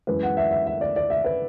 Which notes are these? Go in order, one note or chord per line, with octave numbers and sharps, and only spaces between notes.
F#2 E3 G#3 B4
F#5
E5
E5
E5
D5
D5
E5
B4